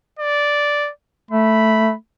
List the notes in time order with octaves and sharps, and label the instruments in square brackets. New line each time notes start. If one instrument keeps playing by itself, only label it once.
[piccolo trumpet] D5
[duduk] A3 [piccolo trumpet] B5